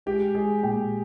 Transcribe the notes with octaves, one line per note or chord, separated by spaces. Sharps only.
G#3 G4
G#3 G#4
A#2 G5